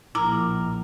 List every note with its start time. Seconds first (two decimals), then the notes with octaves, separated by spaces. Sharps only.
0.15 A#1 E4 A#4 D6